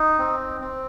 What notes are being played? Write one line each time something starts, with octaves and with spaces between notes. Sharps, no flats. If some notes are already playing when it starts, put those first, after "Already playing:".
Already playing: D#4
C4
C4